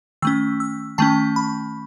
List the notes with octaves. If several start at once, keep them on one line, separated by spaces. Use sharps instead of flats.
D#3 A3 C#4 E6
E6
D#3 A3 C#4 A5
B5